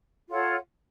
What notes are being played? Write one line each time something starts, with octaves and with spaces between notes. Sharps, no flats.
F4 A4 C#5 F#5